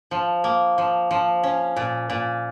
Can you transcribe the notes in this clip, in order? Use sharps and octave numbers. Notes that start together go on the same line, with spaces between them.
F3
A#3
F3
F3
C#4
A#2
A#2